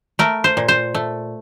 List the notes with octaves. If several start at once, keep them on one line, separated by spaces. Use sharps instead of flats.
A3 A#4
C5
A#2
C5
A3